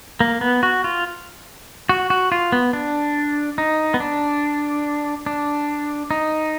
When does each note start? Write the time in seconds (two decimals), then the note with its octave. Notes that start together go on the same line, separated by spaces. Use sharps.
0.20 A#3
0.41 B3
0.63 F#4
0.84 F4
1.89 F#4
2.10 F#4
2.32 F4
2.52 B3
2.73 D4
3.58 D#4
3.94 B3
4.00 D4
5.26 D4
6.11 D#4